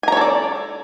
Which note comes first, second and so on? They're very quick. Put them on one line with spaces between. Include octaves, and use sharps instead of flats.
G#5 A#5 C#5 A4 D5